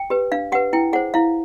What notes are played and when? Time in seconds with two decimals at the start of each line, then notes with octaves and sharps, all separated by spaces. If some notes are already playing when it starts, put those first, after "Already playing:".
Already playing: G5
0.10 G4 B4
0.32 D4 F5
0.52 G4 B4 F#5
0.73 E4 G5
0.93 G#4 C5 F#5
1.14 E4 F5